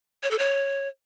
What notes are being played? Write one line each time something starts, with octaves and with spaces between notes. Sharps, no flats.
C#5
A4
C#5